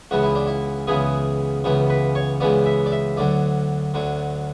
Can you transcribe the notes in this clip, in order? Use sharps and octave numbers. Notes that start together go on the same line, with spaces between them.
C#2 C#3 E3 B3 F#4
E4
D4
E4
C#2 C#3 E3 B3 G#4
C#2 C#3 E3 B3
B4
C#5
C#2 C#3 E3 B3 D5
E5
D5
E5
D2 D3 F#3 D5
D2 D3 F#3